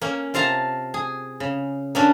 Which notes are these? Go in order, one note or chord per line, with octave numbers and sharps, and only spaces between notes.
A#3 C#4
C3 F4 F5 A5 A#5
G#4
C#3
A#3 C#4 D4